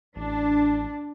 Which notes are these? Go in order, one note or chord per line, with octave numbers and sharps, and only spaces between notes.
A1 D4